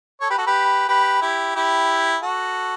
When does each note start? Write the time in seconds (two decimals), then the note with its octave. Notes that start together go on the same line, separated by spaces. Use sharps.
0.21 A4 C#5
0.30 G4 B4
0.38 F#4 A4
0.47 G4 B4
0.88 G4 B4
1.22 E4 G4
1.56 E4 G4
2.23 F#4 A4